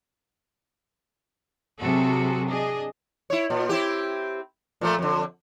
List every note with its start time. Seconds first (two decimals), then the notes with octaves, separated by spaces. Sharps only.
1.81 C3 F#3 F#4 G#4 A4
2.48 D4 G#4 D#5
3.30 E4 C#5
3.50 A#2
3.69 C4 E4 G4
4.81 A#2 F3 A3
4.99 F2 D3